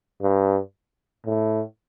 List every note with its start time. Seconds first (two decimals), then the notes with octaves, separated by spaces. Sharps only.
0.22 G2
1.26 A2